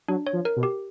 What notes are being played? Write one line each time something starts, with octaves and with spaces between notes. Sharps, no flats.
F#3 D4
C#5
F3
A#4
B2
G4